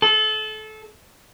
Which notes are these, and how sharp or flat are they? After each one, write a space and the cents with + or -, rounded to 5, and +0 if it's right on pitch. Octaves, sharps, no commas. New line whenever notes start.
A4 -25